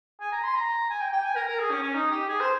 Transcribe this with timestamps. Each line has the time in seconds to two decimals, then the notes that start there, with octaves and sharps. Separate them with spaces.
0.20 G#5
0.32 A#5
0.44 C6
0.55 A#5
0.90 G#5
1.01 G5
1.13 G5
1.25 G#5
1.36 A#4
1.48 A#4
1.59 G#4
1.71 C#4
1.82 C#4
1.94 D#4
2.11 G4
2.29 G#4
2.40 C5